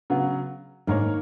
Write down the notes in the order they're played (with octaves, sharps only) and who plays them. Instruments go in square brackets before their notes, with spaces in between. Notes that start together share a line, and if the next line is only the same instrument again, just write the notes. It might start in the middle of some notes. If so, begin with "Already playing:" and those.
[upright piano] C#3 F#3 B3
[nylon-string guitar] G#2 [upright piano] D#3 A#3 D#4 A#4 C#5